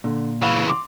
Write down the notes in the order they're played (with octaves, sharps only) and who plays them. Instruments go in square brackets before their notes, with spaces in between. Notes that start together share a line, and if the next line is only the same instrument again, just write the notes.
[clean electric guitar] A#2 [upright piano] D3
[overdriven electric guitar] C#3 E3 [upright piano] F5 B5
[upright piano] C6 D6